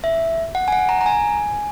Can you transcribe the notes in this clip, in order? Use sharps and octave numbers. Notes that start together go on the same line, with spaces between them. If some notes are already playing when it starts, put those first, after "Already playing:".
E5
F#5
G#5
F#5
A#5
A#5
G#5